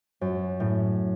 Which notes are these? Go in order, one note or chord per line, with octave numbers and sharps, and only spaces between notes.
F#2
A2